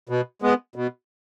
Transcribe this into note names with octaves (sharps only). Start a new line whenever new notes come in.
B2
G#3 B3
B2